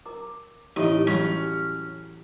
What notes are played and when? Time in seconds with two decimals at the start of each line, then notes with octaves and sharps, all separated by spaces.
0.06 A#4 A#5 D6
0.76 A1 A2 D#4 G4 D#5 C#6
1.07 A1 F#3 G3 C#4